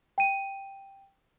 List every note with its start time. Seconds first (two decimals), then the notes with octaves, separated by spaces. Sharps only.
0.18 G5 D#7